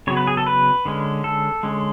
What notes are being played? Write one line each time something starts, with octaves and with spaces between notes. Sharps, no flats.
C#3 F#3 B3 C#5
B4
G#4
A4
B4
D3 G#3 C#4
A4
D3 G#3 C#4